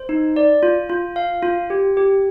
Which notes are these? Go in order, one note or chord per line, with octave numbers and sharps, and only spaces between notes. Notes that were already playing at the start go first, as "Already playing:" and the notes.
Already playing: C5
D#4
D5
F4
F4
F5
F4
G4
G4